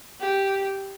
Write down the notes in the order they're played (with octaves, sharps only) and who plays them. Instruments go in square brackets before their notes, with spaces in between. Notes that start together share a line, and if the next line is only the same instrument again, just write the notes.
[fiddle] G4